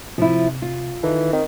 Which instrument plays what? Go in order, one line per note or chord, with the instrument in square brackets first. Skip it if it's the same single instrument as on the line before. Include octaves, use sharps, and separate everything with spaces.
[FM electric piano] C3 [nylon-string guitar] F3 E4
[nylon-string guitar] F4
[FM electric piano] D#3 D#4 A4 [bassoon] E3
[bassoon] D#3 [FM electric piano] C4 A#4